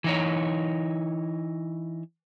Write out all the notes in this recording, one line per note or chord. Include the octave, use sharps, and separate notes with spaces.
E3 D#4 C#5